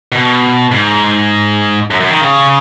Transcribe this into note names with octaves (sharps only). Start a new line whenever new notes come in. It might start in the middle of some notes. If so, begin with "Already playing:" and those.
B2
G#2
F#2
F#2
D#3
C#3